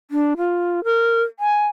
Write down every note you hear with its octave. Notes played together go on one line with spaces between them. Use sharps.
D4
F4
A#4
G#5